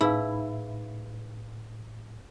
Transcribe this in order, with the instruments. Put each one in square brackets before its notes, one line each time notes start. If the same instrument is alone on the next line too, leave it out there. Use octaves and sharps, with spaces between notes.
[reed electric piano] A2 [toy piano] D#4 [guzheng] E4 [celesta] G#4 B4 F5